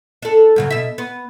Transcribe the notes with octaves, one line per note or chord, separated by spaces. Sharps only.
D4 A4
G2 C#3 F#3
B2 E5
B3